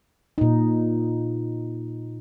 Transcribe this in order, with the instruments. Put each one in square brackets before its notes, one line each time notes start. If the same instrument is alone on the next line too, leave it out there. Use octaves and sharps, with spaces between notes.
[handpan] A#2 D#4